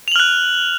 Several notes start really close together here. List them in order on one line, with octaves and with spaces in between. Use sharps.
F7 F#7 F6 F#6